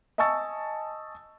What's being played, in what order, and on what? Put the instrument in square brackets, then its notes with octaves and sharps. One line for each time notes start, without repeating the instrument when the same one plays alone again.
[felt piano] D#5 G#5 A5 C#6 E6 A6